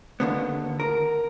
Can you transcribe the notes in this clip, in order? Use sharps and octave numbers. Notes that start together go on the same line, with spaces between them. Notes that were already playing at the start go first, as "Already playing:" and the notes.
D#2 D3 B3
A#4